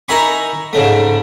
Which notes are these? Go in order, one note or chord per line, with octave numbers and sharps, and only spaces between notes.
D#4 A#4 E5 G#5 B5 C#6
G#2 C#3 A3